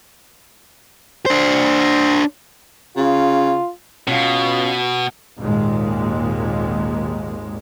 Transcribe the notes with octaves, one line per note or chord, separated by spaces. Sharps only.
D4 C5
C#3 F4
B2 C#4 F4
G#1 D#2 A#2 G#3